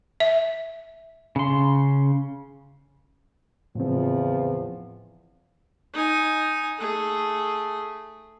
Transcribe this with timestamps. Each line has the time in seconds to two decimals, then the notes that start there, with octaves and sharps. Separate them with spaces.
0.20 E5
1.36 C#3 C6
3.75 E2 A2 C#3 F3 C4
5.93 D#4 G#5
6.78 A3 G#4